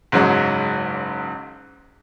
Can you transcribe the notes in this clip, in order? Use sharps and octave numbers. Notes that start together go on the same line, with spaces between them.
F#1 G#2 F#3